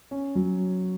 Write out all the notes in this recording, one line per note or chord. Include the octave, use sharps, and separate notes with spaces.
C#4
F#3